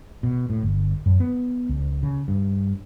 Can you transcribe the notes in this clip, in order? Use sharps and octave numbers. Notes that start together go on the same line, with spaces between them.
B2
A2
G1
F#2
B3
C#2
C#3
G2